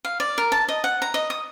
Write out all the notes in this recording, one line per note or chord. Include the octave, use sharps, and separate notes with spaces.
F5
D5
A#4
A5
D#5
F#5
A#5
D#5
D#6